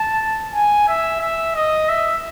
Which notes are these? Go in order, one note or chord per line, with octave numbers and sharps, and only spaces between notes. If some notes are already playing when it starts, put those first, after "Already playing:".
Already playing: A5
G#5
E5
E5
D#5
E5